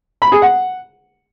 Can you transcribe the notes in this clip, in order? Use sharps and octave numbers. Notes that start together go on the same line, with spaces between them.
B5
G#4
F#5